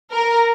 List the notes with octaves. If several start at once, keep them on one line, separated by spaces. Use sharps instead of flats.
A#4